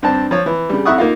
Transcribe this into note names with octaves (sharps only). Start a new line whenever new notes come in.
G2 C4 D4 A5
F3 C#5
E3
C#3 G3
F2 E4 E5 F#5 C#6 D#6
A#3 D#4 F4